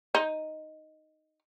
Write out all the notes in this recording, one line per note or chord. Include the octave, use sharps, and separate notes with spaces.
D#4